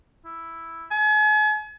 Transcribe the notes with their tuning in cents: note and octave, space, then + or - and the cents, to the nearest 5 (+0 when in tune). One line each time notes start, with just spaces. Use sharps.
E4 +0
G#5 +40